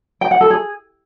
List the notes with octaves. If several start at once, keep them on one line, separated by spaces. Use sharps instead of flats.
G5
F#5
A4
G#4